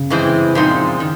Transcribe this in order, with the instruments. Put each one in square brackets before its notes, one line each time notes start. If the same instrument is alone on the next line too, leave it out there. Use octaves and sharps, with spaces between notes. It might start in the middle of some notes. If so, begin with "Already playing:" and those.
Already playing: [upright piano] C#3
[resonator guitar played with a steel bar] G2 E3 G#3 C4 E4
A#2 F3 G#3 C4 D#4
D#3